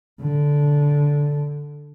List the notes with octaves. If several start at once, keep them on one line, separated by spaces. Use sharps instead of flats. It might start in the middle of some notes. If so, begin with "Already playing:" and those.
D3